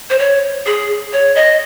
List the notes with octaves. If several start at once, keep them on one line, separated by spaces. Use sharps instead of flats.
C5
C#5
G#4
C#5
D#5